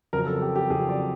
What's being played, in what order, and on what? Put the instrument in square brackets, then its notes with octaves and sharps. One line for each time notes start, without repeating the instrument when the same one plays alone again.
[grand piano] F2 C#3 F#3 A#4
A4
G4
G4
F2 C#3 F#3 G#4
D5